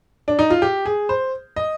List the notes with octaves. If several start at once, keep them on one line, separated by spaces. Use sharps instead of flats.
D4
D#4
F4
G4
G#4
C5
D#5